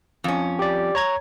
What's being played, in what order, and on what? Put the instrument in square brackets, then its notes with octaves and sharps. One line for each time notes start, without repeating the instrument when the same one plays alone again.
[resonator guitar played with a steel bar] F2 C#4
[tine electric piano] G4 D5
C#5 A#5 G#6